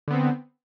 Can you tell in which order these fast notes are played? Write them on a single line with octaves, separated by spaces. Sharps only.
D3 B3 C4